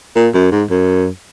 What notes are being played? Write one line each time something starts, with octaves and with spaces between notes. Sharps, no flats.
A#2
F#2
G#2
F#2